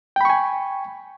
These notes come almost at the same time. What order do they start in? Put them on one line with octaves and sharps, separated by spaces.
G5 B5 C#6 G#5